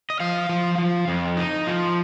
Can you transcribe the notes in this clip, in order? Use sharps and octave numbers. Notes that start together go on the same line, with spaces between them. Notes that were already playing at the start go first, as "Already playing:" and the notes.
D#5
F3 F5
F3
F3
F2
D#4
F3